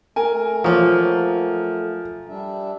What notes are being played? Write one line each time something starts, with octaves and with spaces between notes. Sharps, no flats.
A3 A#4 G#5
F3 F#3 A#3
G3 D4 E5